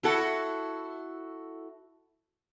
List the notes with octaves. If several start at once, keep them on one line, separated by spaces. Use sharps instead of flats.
E4 F#4 A4